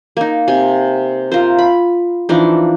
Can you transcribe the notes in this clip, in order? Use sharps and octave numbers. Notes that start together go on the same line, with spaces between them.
A#3 D#4
C3 G#5
F4 A#4 C5
B5
E3 F3 D4 D#4